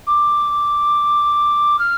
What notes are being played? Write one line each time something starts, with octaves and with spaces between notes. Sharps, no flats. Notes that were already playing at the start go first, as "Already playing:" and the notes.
D6
F6